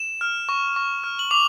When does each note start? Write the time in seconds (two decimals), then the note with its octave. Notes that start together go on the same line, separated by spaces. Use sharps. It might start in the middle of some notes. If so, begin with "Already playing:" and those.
Already playing: E7
0.21 F6
0.49 C#6
0.76 C#6
1.04 F6
1.19 F#7
1.31 D6 F7